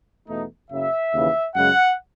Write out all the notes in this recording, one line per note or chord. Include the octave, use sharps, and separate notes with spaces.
E2 B2 A3 D#4
F#1 F#2 C#3 E5
D#2 C#3 E3
F#2 C#3 G#3 F#5